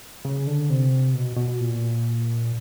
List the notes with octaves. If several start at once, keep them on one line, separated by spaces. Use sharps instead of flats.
C#3
D3
C3
B2
B2
A#2